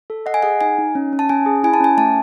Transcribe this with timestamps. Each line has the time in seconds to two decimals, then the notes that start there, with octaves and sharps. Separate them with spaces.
0.10 A4
0.26 D#5 F#5
0.34 G#5
0.43 G#4 F#5
0.61 D#4 G#5
0.78 D#4
0.95 C#4
1.13 C#4
1.19 A5
1.29 C#4 G#5
1.46 G#4
1.63 E4 G#5
1.74 A5
1.80 C#4 G#5
1.98 A3 A5